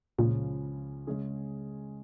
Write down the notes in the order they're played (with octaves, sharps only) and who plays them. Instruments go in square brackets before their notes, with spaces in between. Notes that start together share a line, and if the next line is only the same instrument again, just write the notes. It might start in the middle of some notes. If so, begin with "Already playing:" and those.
[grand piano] C#2 C#3 F3 C#4 [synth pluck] A#2
[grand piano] C#3 G#3 C#4 G#4